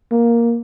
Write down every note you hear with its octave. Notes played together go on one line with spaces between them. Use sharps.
A#3